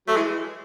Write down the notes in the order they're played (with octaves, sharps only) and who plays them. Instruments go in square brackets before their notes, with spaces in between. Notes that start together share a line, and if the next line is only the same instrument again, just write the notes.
[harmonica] F#3 [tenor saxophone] A3
[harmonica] E3 [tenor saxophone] G#3